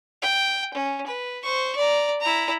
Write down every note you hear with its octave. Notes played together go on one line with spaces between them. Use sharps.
G5
C#4
B4
C5 C#6
D5 A#5
E4 A#5